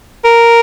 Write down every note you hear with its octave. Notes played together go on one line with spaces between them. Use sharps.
A#4